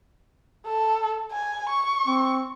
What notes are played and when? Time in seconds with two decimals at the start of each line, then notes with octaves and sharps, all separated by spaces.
0.66 A4
1.32 G#5
1.70 C#6
2.07 C4